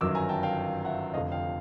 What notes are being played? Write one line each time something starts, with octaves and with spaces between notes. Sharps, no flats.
G1 F#2 D#3 F#3 D6 E6
G#5 A#5
G5 A5
F5 G5
E5 F#5
F1 F2 D3 D#5 F5
F5 G5